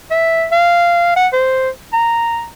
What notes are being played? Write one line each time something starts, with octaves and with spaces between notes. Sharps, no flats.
E5
F5
F#5
C5
A#5